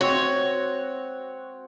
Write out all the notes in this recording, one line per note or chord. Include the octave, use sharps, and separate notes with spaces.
C4 F#4 C#5